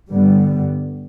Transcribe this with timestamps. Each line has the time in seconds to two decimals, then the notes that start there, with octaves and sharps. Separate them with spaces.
0.10 G2 D3 G3 B3